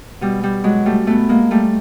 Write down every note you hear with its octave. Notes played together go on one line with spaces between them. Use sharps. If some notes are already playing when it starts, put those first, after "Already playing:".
B2 G3
G3
F#3 G#3
G3 A3
B2 A3 B3
G#3 A#3
G3 A3